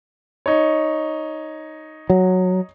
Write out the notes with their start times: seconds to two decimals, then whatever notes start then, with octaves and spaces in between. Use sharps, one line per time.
0.46 D#4 C#5
2.10 F#3